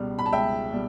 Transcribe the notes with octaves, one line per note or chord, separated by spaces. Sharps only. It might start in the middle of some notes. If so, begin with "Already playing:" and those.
Already playing: C#2 B2 G3
B5
A5
C#2 E5 G5
B2 G3